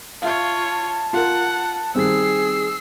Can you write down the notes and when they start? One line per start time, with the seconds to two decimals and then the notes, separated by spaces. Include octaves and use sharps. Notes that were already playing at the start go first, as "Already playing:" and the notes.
0.22 F4 C#5 E5 F5 A5
1.13 F4 A#4 F#5
1.95 D#3 G3 C4 G#4 E6 C7